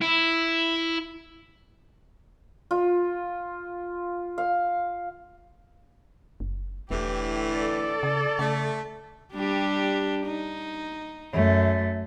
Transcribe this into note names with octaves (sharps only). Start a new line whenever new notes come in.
E4
F4
F5
F#1
E1 A2 D3 E3 G4
A4 D5
C#3
C#3 A3
G3 D4 G4
D#4
F#2 A3